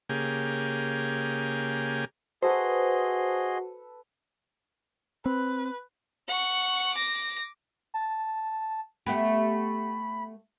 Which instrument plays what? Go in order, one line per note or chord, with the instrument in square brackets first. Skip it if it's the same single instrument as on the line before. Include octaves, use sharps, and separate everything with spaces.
[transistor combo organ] C#3 A#3 G4 G#4
[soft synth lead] F#4 [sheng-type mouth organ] G#4 D#5 C6 [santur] A4 B4 [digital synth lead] C5
[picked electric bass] C4 [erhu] B4
[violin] F#5 C#6
D6 A#6
[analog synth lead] A5
[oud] A3 B3 G4 [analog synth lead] B5